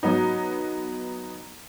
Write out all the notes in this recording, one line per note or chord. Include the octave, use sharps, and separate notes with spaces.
F#3 B3 D#4